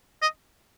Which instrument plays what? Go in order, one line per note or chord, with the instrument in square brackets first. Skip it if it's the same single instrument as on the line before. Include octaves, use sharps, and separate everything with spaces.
[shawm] D#5